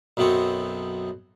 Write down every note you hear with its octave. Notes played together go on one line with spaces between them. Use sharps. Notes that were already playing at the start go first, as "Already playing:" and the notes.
B1 F#2 F#3 B3 C4 C#6